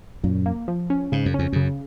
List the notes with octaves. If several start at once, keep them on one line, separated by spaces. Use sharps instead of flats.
F#2 A#2
A#3
F3
C#4
G#2 C#3
F#2
F2 C#4
F#2 C#3